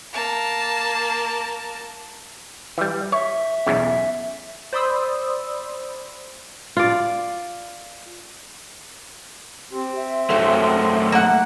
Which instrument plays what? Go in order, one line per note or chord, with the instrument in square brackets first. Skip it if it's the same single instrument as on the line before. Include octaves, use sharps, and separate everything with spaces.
[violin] A#3 A5
[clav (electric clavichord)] E3 G3
[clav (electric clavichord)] C#5 [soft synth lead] E5
[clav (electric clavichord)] B1 E2 C#3
[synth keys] C5 D5 B5 C6 D#6 E6
[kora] F4 D5
[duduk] C4 [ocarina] G4
[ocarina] E5
[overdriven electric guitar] F#2 A3 [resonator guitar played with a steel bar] F#3
[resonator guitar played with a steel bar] A#3 F#5